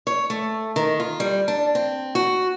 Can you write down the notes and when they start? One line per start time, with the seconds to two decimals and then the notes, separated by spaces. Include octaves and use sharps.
0.07 C#5
0.30 A3
0.76 D#3
1.00 F4
1.20 G3
1.48 D4
1.75 C4
2.15 F#4